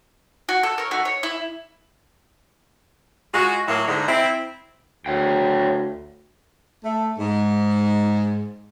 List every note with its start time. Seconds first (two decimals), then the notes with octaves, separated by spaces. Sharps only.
0.49 F#4
0.63 A4
0.78 A#4 C#5
0.91 A3 D#4 F#4
1.05 C#5
1.23 E4
3.34 G#3 F4 F#4
3.68 A2 F#3 A#3 E4 C#5
3.87 G#2 D3
4.08 C4 E4
5.06 D2 C#5 F5 G5
6.84 A3
7.19 G#2